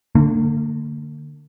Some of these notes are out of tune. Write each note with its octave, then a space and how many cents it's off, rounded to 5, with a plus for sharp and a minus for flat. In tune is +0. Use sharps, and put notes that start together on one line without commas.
D3 +10 A#3 -40